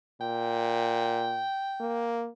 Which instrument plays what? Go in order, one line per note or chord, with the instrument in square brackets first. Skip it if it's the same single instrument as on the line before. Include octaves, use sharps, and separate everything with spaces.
[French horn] A#2 [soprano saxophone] G5
[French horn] A#3